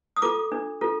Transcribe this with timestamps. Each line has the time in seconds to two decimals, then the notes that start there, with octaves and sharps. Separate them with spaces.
0.16 D#6
0.22 F4 A4 D6
0.52 D4
0.81 F4 A4